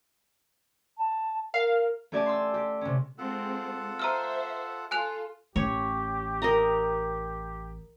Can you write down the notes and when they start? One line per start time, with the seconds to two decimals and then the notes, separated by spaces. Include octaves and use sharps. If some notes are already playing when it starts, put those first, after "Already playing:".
0.97 A5
1.54 A#4 F5
2.12 A3 C#4 G4 D5 G#5 A5
2.26 C6 E6
2.54 G4
2.81 C3 C#4
3.18 G#3 C4 F4 A4 F#5
3.99 C5 E5 A#5 E6 F6
4.91 F4 A4 G#5 F#6 F7
5.56 A1 G4 C#5
6.42 A#4 D#5 A#5